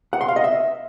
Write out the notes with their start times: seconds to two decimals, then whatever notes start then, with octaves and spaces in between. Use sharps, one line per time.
0.13 F#5
0.21 C6
0.28 F5
0.36 D#5
0.44 E5